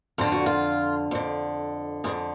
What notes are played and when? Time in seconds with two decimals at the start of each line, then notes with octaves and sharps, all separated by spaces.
0.18 F2 D3 F4
0.32 F#4
0.46 F4
1.11 F2 D3
2.04 F2 D3 G#4